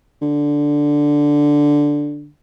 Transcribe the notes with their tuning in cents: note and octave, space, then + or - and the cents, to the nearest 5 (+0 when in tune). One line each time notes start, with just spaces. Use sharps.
D3 -5